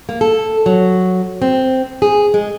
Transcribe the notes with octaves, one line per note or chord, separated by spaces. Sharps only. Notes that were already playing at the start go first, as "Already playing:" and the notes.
A#3
A4
F#3
C4
G#4
G#3